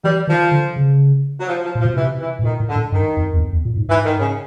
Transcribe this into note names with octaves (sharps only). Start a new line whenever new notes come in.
E3 G3
D#3 F3
D3
C#3
F#3
F3
F3
A#2 F3
B2
C3 E3
E3
A2
A#2 D#3
A2
D3
A2
G2 D#3
F2
E2
F2
E2
A#2
G#2
G#2 E3
D#3
C#3